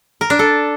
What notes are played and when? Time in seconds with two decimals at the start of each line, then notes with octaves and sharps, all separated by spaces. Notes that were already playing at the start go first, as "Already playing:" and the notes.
0.21 A#4
0.30 D4
0.39 A4